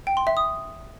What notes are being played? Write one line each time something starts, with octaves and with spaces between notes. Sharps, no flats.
G5
C6
E5
D#6